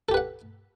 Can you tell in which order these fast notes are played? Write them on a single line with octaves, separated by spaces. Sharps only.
A4 G4 B4 F#5